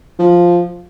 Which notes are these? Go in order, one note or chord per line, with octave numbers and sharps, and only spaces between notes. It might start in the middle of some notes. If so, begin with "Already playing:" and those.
F3